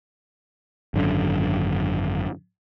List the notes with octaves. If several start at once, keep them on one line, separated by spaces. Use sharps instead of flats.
G#1 F#2 D3